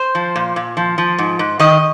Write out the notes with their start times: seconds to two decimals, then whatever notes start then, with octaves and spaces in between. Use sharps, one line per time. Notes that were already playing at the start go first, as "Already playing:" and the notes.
Already playing: C5
0.15 F3
0.36 A#2
0.56 A#2
0.77 F3
0.98 F3
1.18 G#2
1.39 G#2
1.60 D#3 D#5